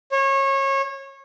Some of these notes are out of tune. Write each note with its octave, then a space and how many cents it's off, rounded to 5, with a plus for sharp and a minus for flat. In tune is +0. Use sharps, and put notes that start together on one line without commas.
C#5 -25